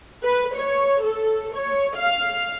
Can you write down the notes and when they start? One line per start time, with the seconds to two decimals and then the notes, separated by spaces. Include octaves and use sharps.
0.24 B4
0.57 C#5
1.02 A4
1.56 C#5
1.97 F5